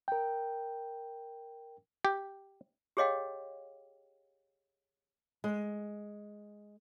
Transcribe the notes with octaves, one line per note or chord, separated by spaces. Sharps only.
A#4 G5
G4
G4 G#4 C#5 D#5 F5 G5
G#3